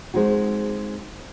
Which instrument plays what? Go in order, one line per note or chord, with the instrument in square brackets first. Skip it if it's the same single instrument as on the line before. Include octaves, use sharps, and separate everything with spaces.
[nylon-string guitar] G#3 C4 D#4 F#4